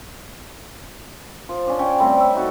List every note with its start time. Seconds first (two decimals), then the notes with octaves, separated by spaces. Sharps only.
1.49 F3
1.67 C#4 D4
1.79 C#4 C#5 G5
1.99 G3 A3 C4
2.17 C#5 E5
2.35 D#4 F#4 A4